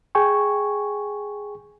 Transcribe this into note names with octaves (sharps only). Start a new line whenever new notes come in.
G#4 G5 G#5 C#6